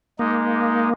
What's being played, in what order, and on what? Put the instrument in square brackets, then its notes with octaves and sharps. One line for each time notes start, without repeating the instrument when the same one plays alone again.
[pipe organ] G#3 D#4 [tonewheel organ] A#3